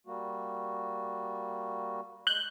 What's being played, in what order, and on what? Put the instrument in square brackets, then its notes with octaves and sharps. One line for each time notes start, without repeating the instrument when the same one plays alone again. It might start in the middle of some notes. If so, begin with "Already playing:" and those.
[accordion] G3 A#3 F#4
[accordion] G#3 [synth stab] F#6 G6